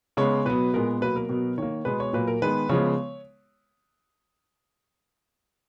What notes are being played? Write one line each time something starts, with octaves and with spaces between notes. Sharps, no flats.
C#3 G#3 B3 C#5
B2 F#3 B3 B4
A#2 G#3 B3 A#4
B2 F#3 A#3 B4
A#4
B2 F#3 B3
D#3 A#3 C#5
B2 G#3 B3 B4
C#5
A#2 F#3 A#3 B4
A#4
D#3 G#3 B3 B4
C#3 F3 G#3 B3 C#5